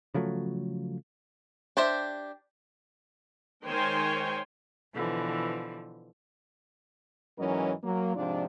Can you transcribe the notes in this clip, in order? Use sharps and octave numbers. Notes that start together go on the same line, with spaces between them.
C#3 F3 F#3 A3
D4 G4 C5 E5
D#3 G#3 C5 C#5 G5 G#5
B2 D3 E3 F3
G#2 E3 F#3 C#4 A#4 D#5
F#3 A#3
G#2 C3 F3 D4 F4 D5